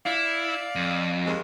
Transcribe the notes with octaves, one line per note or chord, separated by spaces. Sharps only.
E4 D5 F5
F2
D#2 G#3